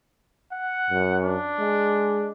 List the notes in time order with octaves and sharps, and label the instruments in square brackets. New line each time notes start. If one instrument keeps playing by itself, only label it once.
[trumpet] F#5
[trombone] F#2
[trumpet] D4
[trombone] G#3